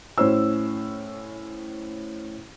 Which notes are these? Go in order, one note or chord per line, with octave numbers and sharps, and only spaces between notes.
A2 C#4 C5 E6